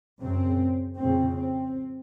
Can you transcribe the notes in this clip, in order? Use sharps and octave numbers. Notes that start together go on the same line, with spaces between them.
F#2 C#3 C4
F2 C#3 C4
C4